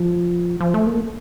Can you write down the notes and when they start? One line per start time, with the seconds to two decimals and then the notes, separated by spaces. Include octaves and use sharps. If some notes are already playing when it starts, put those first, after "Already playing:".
Already playing: F3
0.60 F3
0.74 A3
0.87 A#3